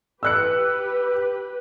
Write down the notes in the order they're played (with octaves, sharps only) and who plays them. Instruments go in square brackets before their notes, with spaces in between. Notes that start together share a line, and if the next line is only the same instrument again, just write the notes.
[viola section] G4 B4 [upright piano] E6 F#6 C#7